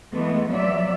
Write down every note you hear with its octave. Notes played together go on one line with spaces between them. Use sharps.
E3 G#3 A3 B3
F3 F#3 D5 E5